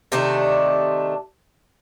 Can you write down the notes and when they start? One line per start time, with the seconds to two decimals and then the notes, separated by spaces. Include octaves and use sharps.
0.12 C3 D#3 A3 D4